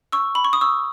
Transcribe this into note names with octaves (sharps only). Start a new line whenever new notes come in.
C#6 E6
B5
C#6
D#6
C#6 E6